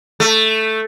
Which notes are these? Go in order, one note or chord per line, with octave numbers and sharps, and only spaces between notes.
A3